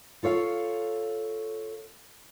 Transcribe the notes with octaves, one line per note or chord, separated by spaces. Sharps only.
F4 A4 C#5 F5